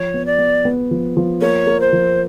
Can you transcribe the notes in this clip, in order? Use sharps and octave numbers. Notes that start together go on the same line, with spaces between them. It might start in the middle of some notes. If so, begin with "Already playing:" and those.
Already playing: F3 C#5
B3
D5
B3
B3
F3
F3
A#3 C#5
A#3
C5
F3